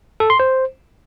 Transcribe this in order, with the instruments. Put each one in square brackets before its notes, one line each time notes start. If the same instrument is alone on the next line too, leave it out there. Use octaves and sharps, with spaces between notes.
[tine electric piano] A4
C6
C5